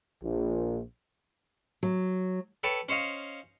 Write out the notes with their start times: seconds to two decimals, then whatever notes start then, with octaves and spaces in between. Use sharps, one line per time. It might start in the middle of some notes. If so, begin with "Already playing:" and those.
0.23 A#1
1.83 F#3
2.63 A4 B4 C#5 G5 A5
2.89 C#4 C5 C#5 D#5 F5